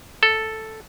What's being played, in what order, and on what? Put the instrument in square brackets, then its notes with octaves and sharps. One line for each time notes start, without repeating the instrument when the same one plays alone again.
[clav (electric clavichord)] A4